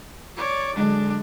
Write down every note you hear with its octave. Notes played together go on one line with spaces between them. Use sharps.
C#5 D5
D3 F#3 G#3 D4